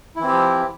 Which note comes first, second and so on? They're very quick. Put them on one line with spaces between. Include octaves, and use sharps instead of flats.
E4 E3 C4 G4 F3